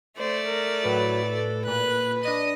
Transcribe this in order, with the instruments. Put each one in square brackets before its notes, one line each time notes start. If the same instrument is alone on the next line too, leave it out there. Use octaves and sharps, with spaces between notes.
[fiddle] A3 D5 [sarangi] C5
[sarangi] A#4
[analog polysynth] A2 B4 [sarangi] F#3
[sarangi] A4
[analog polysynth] A#2 [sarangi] B4 [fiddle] F#6
[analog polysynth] D4 D#7 [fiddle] D#5